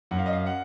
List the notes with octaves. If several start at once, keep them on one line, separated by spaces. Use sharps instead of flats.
F#2 F#5
F5
D#5
F5
F#5